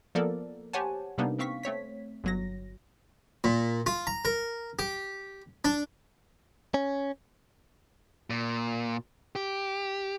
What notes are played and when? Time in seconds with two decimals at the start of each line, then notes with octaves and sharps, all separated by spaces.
0.15 F3 A#3 B3 A4 A#4 D5
0.73 G4 C5 C#5 F#5 G#5 A5
1.18 C3 G3 A#3 B3 D4 D#4
1.39 B3 C4 F5 C#6 B6
1.63 A3 C4 C#5 B6
2.24 G1 F#3 A#6
3.44 A#2
3.86 F4
4.07 A#5
4.25 A#4
4.79 G4
5.65 D4
6.74 C#4
8.30 A#2
9.36 G4